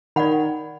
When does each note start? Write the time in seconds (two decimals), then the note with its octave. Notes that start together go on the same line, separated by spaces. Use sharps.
0.16 D#3 D5 F#5 B5